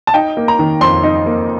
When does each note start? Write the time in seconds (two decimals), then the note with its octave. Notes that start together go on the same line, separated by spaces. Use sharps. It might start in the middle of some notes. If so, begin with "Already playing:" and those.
0.07 A5
0.14 D#4 G5
0.37 A#3
0.48 A#5
0.59 D#3
0.81 F2 C6
1.03 D#4
1.26 A#3